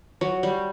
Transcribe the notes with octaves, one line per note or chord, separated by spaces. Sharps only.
F#3
G3